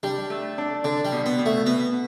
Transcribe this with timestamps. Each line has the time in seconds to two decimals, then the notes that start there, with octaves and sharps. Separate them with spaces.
0.03 G3 D4
0.30 A3
0.58 D4
0.84 D3 D4
1.05 G3
1.12 B2
1.26 B3
1.39 B2
1.46 A3
1.66 B2 B3